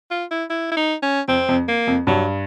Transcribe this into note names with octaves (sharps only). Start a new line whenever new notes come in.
F4
E4
E4
E4
D#4
C#4
F2 C4
F2
A#3
F2
G2 F#3